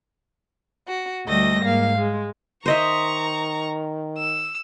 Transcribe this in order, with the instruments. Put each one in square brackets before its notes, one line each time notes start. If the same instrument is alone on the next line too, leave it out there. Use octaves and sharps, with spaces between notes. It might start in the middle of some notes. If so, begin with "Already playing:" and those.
[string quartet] F#4
D2 G3 A3 D#5 A#6
G#2 A#3 F5
G#3
[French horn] D#3 [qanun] C5 D#5 E5 [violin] A#5 C#6
[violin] E6